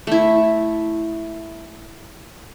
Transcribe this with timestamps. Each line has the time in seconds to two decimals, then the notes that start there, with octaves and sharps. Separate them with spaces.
0.07 A3 E4